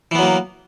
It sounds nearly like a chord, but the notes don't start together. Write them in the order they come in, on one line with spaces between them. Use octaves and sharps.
E3 B3 F#3 A#3